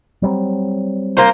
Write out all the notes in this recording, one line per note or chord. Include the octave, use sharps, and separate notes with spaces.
F#3 G3 C4
A#3 F4 C5